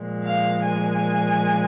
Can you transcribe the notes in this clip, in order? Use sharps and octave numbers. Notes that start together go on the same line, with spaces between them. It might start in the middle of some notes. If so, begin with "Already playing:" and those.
Already playing: A#2 F3 G#3
F5
G#5